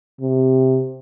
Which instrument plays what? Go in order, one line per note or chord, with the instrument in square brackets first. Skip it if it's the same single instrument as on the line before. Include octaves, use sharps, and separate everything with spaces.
[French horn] C3